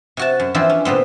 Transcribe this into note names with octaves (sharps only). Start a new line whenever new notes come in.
C3 F#4 A5
F#2
E3 F3 C4 D4 E4
C#4
A#2 D3 B3 C4